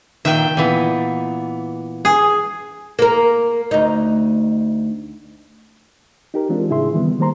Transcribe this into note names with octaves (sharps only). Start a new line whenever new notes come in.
A#2 D#3 E5 G5
A#2 E3 B3
G#4
A#3 A#4
D2 D#4
D#4 G4 A#4
E3 G#3 C4 D4 F4
A2 C#3 E4 G#4 E5 C6
D#3 E3 G3 B3
D#3 G3 A#3 C5 A#5 C6